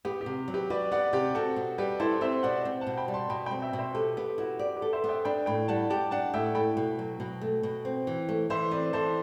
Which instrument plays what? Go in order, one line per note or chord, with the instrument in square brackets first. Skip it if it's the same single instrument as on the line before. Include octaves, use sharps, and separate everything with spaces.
[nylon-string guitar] B3 [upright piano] G4
[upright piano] G4
[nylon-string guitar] C3
F#3
[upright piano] G4 B4
[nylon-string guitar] F#4 [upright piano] B4 D5
[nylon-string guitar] B3 [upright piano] D5 F#5
[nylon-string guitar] C3 [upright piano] G4
[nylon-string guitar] C4 [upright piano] F#4 A4
[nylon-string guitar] B2
[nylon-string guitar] G3 [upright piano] G4 B4
[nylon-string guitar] E4 [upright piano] A4 C5
[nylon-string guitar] C4 [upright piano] C5 E5
[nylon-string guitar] B2 [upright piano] D5 F#5
[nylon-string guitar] C4
[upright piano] F#5 A5
[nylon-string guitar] B2
[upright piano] G5 B5
[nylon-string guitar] G3
[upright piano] A5 C6
[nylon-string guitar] B2 [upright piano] G5 B5
[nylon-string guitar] C4 [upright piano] G5 B5
[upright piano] E5 G5
[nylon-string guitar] B2
[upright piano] C5 E5
[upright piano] G4 B4 [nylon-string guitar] A4
[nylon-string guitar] B3 [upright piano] G4
[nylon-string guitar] E4 [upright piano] F#4
[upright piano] G4 [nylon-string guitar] D5
[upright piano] G4 B4
[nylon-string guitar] A4
[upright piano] C5 E5
[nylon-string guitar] B3
[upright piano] E5 G5
[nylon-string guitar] D4 [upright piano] G5 B5
[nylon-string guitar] A2 [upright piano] G5 B5
[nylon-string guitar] G3 [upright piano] F#5 A5
[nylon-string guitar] G4 [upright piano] F#5 A5
[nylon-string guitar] D4 [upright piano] F#5 A5
[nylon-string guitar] A2 [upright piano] E5 G5
[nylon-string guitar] A3 [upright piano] G5 B5
[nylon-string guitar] B2
F#3
B2
A3
B2
C4
E3
A3
[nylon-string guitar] E3 [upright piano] C5 E5
[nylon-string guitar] C4 [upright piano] B4 D5
[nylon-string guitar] E3 [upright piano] A4 C5